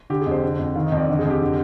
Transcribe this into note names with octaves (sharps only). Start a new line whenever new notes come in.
D3 G4
G#4
F2
C5
D3
F2
D#3 F5
D#5
F2
D5
D3
G#4
F2 G4
D3